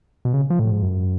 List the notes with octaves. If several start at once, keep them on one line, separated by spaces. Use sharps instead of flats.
B2
C#3
F3
A2
G#2
F#2